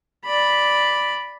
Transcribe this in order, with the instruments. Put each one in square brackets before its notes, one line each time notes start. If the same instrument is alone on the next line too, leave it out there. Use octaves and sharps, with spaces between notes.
[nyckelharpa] D5 B5